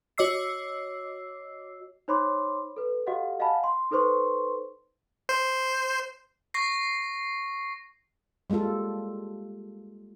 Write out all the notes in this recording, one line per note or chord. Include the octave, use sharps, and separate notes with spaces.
F#4 C#5 D#5 D6 E6 C7
D#4 C5 C#5 B5 C6 D6
A4 B4
F#4 G4 A4 D#5 F5 F#5
D#5 F5 F#5 G#5 A5 B5
C6
D#4 A4 B4 C5 C6 C#6
C5
C#6 A#6 C7
G3 G#3 A#3 F4 A4